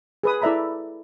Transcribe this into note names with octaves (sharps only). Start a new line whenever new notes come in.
G#4 B4 D#6
E4 A4 D5 E5 A#5 B5